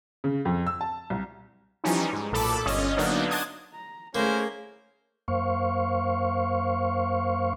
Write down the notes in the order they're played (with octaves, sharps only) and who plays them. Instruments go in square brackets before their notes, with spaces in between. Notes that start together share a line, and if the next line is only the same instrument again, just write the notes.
[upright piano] C#3
F2
E6
A5
C2
[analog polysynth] E3 F3 G3 C#4 D#4
G#2
B1 A#2 A4 A5 B5 D6
G1 C#4 F4 D#5
D3 F#3 A#3 B3 D4 D#4
A5 C6 D6 D#6 F#6 G#6
[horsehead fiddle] A#5
[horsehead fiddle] A3 G#4 [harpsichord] A#3 [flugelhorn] C#4 [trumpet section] E4 A#4 C5
[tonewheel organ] F#2 A#3 C5 F5 C#6